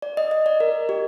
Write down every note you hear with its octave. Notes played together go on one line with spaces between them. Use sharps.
D5
D#5
D#5
D5
A#4
G4